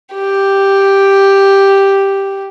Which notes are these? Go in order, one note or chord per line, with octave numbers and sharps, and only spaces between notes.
G4